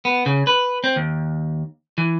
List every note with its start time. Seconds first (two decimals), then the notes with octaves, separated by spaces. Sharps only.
0.05 B3
0.26 C#3
0.47 B4
0.84 C4
0.96 D#2
1.98 E3